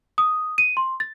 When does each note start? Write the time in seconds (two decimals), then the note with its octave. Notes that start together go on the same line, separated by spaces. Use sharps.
0.18 D#6
0.58 D#7
0.77 C6
1.00 A6